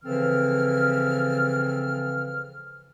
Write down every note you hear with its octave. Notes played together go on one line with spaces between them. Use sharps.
C#3 E3 F3 C4 A4 F6